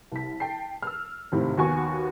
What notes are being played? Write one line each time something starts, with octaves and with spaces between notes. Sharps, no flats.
C2 B6
G5 A5 C7
E6 F6
G#1 A2 C3
D#2 B3 F#4 G#5 C#6